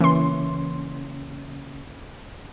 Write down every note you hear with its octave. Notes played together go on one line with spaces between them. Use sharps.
C#3 E3 A#3 C#4 C6